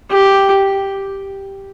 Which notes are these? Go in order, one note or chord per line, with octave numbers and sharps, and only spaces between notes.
G4